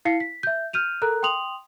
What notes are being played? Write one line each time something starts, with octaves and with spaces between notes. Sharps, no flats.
E4 F5 C7 C#7
B6
E5 G6
F6 G6 D#7 F7
A4 A#4 A#5 F#6
G5 C6 D#6 F7 F#7